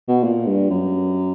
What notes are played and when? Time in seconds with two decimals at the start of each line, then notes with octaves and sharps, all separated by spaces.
0.08 B2
0.24 A#2
0.47 G2
0.70 F#2